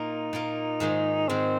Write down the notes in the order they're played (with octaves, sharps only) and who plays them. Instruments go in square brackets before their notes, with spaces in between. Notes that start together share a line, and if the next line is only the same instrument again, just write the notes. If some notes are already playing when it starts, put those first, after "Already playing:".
Already playing: [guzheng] A#2 A#3 F4 [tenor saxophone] D#4
[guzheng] A#2 A#3 F4
G#2 D#3 G#3
[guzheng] G#2 D#3 G#3 [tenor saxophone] C4